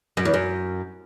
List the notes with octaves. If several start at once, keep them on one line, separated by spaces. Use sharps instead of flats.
F#2
E2
F#2